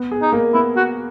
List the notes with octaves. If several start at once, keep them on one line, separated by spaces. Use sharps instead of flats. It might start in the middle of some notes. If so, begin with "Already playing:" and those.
Already playing: B3
G#4
D#4
A#3
B3 E4
F#4